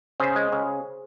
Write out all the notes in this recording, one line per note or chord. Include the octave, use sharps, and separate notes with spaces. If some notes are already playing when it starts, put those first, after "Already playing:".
C#3 G#4 C5
G#3
C#3